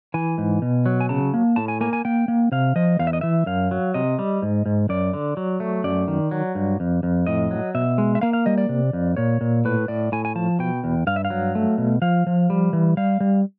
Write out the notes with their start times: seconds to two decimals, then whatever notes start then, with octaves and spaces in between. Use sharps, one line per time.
0.14 E3 G#5
0.38 G#2
0.62 B2
0.86 F#3
1.01 G#5
1.09 C#3 A5
1.34 A#3
1.56 A2 A5
1.68 G#5
1.81 A#3 G#5
1.93 G#5
2.05 A#3 G5
2.28 A#3
2.52 C3 F5
2.76 F3 D#5
2.99 E2 F5
3.07 E5
3.13 D#5
3.21 E3 E5
3.46 F#2 F5
3.71 F#3
3.94 C3 D#5
4.19 G3
4.42 G#2
4.66 G#2
4.89 F#2 D5
5.13 D3
5.37 F#3
5.60 A3
5.84 F#2 D5
6.08 D#3
6.31 F#3
6.55 G2
6.80 F2
7.03 F2
7.27 A2 D#5
7.51 F#3
7.75 B2 E5
7.98 G#3
8.15 E5
8.21 A#3 F5
8.33 F5
8.46 G3 D#5
8.58 D5
8.69 C3
8.93 F2
9.17 A#2 C#5
9.41 A#2
9.65 A2 B4
9.88 A2 D5
10.12 A2 G#5
10.25 G#5
10.35 F3 A5
10.59 B2 G5
10.84 E2
11.07 G2 F5
11.16 E5
11.25 F5
11.30 F#3
11.55 A3
11.78 B2
12.02 F3 F5
12.27 F3
12.50 G3
12.73 E3
12.97 G3 F5
13.20 G3